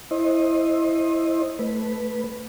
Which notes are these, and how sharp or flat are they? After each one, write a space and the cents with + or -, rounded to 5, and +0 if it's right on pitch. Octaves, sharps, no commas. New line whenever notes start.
E4 +0 C5 +30 D#5 +0
A3 +0 B4 +0